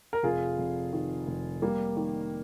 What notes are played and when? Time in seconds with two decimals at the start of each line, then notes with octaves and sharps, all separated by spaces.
0.13 A#4
0.23 F1 F4 G#4
0.58 F1
0.93 D#3
1.27 F1
1.62 G3 A#3
1.97 D#3